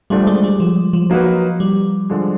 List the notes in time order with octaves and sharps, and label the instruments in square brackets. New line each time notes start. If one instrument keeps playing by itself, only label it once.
[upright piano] D2 D3 F3 A3 D4 [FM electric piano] G3
[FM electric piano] G#3
G3
F3
F3
[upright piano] F#3 A#3 D#4 F#4 B4
[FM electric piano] G3
[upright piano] D3 F3 G#3